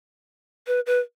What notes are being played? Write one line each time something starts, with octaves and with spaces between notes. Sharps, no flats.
B4
B4